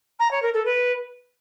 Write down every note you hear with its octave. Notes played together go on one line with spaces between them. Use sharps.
A#5
C#5
A#4
A4
B4